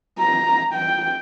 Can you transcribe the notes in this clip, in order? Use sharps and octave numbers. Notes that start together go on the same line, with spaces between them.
A#5
G5